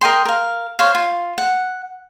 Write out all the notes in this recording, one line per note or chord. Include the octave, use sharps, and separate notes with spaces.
A#4 D#5 G5 C6
A#4 F5
C5 C#5 F5
F4
F#5